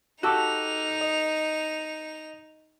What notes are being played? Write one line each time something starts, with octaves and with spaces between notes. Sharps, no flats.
D#4 F#4 G4 A4 D6 E6 F#6 F7
D#5